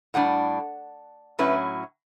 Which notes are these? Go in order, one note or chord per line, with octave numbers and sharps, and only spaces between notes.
A2 G3 D4 F#5
A2 F#3 C#4 E4 B4